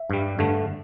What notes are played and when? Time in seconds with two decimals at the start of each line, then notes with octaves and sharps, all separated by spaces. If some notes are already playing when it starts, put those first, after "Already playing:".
Already playing: E5
0.10 G2 G3
0.39 G2 D3 A3